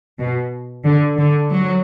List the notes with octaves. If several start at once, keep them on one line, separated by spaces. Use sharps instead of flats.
B2
D3
D3
F#3